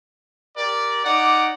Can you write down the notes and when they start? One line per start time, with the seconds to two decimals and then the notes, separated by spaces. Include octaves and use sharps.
0.55 G4 A#4 D5
1.05 D#4 D5 F#5 D6